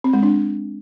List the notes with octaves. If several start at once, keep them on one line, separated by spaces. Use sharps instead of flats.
C4
G#3
D4